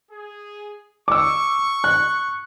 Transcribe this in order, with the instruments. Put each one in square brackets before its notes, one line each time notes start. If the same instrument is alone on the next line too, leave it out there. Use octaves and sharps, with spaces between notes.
[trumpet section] G#4
[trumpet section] C#6 [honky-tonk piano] D6 E6
[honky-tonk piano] F#6